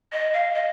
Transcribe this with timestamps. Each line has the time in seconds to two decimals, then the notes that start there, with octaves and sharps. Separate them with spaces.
0.12 D#5
0.33 F5
0.55 D#5